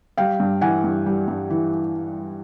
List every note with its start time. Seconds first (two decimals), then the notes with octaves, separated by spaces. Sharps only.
0.17 G3 F5 G5
0.40 G2
0.61 E3 F#5 G#5
0.84 G2
1.06 G3
1.28 G2
1.50 E3